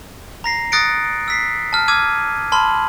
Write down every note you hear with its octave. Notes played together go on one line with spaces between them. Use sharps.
A#5 A#6 C7
D#6 F#6 A6 A#6 C#7 D7
E6 B6 C7
A5 F6
D6 E6 F6 G#6 D#7
A5 B5 C6 F6 F#7